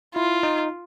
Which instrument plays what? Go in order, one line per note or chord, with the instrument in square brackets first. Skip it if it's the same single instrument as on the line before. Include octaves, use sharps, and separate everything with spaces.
[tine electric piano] E4 [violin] F4
[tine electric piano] D#4